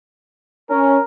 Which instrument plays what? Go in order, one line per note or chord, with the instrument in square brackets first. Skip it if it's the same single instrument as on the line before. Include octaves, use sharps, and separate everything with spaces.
[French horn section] C#4 [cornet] A#4